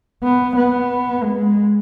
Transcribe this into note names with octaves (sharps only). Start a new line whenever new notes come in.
B3
B3
G#3